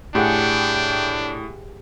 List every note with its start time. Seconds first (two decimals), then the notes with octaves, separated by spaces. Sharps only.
0.15 A2 D4 G4 G#4 F#5 G5